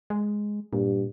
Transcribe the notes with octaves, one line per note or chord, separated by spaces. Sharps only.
G#3
G2 A#2